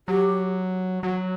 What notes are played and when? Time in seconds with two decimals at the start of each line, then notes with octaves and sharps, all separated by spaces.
0.08 F#3 G4
1.02 F#3 F#4